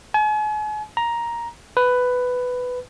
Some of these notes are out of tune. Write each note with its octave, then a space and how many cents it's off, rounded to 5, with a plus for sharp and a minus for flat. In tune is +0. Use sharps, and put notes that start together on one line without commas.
G#5 +40
A#5 +10
B4 +10